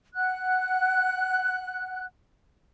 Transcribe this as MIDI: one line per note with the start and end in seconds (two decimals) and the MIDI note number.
0.15 2.05 78
0.15 2.05 90